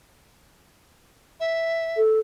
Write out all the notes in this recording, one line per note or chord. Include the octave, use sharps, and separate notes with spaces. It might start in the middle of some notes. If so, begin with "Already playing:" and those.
E5
A4